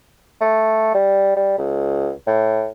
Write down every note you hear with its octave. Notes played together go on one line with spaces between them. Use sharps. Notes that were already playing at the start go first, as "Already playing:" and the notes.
A3
G3
G3
C#2
A2